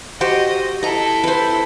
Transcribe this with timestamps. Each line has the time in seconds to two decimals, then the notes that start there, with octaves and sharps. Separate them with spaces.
0.21 F#4 G4 C5 D#5
0.83 E4 A4 D#5 A#5
1.24 B4 C5